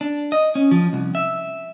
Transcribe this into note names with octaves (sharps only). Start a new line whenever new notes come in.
D4
D#5
C#4
F3
C2
E5